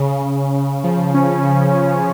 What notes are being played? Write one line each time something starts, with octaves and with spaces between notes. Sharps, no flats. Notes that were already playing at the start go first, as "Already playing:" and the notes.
Already playing: C#3
C#3
C#3
F3
C#4
C#3
C#4